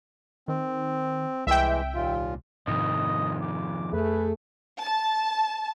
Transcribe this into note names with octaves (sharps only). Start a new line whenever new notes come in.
D#3 C4
C2 E3 G#3 E5 G5
D#2 A#2 F4
F2 G#2 C3 D#3 F3 D#5
D6
F2 A3 G#4 B4
A5